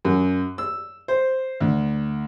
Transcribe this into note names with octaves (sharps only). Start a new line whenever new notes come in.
F#2
E6
C5
D2